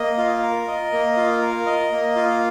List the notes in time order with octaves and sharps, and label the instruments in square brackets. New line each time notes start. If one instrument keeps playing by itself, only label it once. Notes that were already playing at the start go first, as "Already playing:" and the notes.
Already playing: [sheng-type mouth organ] A#3 D#5
F4
A#4
D#5
A#3
F4
A#4
D#5
A#3
F4